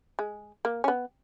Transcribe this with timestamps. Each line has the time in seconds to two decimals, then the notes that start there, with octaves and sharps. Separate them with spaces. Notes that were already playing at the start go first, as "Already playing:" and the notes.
0.19 G#3
0.65 A#3
0.84 C#4
0.88 B3